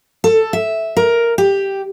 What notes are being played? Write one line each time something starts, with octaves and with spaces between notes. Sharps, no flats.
A4
E5
A#4
G4